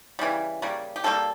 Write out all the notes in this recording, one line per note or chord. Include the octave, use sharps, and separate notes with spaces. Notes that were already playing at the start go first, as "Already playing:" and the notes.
C#3 E3 G3
C#3 G3 A#3
G4
C#3 G3 A#3 A4